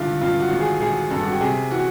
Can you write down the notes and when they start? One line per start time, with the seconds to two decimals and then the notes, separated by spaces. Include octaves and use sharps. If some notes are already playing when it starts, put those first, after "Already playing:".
Already playing: G#1 G2 D3 E4 F4
0.21 G2 F4
0.40 F#4
0.50 G#1
0.60 G#4
0.81 G#1 G#4
1.11 G2 A4
1.23 F#4
1.32 G4
1.41 C3 G#4
1.71 E3 F#4